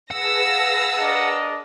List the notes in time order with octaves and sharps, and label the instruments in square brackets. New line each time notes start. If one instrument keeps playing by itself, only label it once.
[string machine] G#4 B4 A5 [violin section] F5 E6 A#6 [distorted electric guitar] F#5
[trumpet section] D4 A#4 D#5